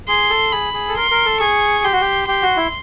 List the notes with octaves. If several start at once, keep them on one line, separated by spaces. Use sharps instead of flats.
G#4 C6
A4
G#4 B5
G#4
A4
A#4 C6
A#4
A4
G#4 C#6
G4 C6
F#4
G4
G4 C6
F#4
E4